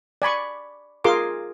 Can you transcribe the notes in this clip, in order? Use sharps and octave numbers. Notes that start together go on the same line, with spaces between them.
D5 G#5 B5 C#6
F4 G#4 A#4 C6 D6